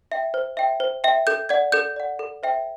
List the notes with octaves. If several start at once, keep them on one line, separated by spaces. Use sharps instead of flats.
E5 G5
C5
E5 G5
C5
E5 G5
A4 G6
D5 F#5 G#6
A4 G6
D5 F#5
A4
C5 E5 G5